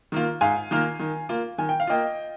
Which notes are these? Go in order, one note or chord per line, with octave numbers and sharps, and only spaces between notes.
D#3 A#3 F4
G#2 F5 G#5
D#3 A#3 F4
D#3
A#3 F4
D#3 G#5
G5
F5
A#3 F4 D#5 G5